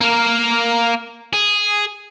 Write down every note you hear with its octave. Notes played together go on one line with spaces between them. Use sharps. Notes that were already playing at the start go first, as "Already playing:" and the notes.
A#3 A#4
G#4